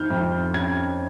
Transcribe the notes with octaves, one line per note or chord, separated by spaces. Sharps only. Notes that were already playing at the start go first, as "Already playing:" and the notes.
Already playing: F2 D#3 F6 G6
F2
C#4 G#6